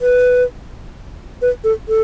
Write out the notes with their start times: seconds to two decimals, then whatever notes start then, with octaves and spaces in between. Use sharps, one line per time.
0.01 B4
1.42 B4
1.64 A4
1.88 A4